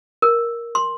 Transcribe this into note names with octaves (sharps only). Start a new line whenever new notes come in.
A#4
C6